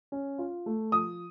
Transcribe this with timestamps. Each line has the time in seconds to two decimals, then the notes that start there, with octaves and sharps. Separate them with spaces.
0.12 C#4
0.38 F4
0.66 A3
0.92 F3 D#6